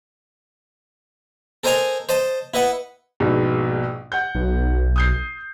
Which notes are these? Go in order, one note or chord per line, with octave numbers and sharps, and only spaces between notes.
A4 A#4 C5 D#5 G#5 A#5
C5 D#5 A5
E4 B4 D#5 F#5
A#1 G#2 B2
F#5 G6
B1
D#6 G6 C7